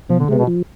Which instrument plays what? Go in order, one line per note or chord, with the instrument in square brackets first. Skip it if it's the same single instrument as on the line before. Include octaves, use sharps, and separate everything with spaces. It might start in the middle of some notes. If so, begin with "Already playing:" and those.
[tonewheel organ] B2 [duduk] F3
[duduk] D3
[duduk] C3 [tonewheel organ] G#3
[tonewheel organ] B3
[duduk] B2
[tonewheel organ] F3